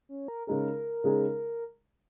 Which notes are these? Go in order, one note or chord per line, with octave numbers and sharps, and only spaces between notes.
C#4
A#4
C#3 G#3 D#4 G#4 A#4
C#3 G#3 D#4 G#4